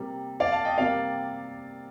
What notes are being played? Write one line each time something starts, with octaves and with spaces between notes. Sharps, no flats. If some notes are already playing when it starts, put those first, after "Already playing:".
Already playing: C3 G3 A#3
D5 F5
F5 A5
D#5 G5
C3 G3 A#3 D5 F5